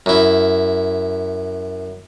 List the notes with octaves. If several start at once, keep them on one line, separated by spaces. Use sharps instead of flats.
F#2 E4